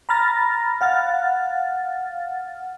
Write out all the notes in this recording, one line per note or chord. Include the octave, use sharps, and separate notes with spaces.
A#5 B5 F6 A6 A#6
F5 F#5 F6 A6